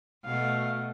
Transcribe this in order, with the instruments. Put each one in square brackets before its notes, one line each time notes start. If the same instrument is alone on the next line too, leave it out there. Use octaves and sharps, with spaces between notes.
[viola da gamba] B2 A3 [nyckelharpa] F5